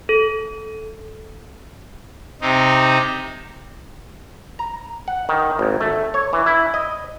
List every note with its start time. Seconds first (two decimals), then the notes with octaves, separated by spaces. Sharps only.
0.09 A4
2.42 C3 C4 D#4
4.59 A#5
5.08 F#5
5.29 D#3
5.59 G#1
5.81 A3
6.14 C#5
6.33 E3
6.46 E4
6.74 D#5